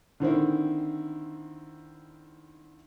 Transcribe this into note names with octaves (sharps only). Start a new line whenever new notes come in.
D3 D#3 C4 E4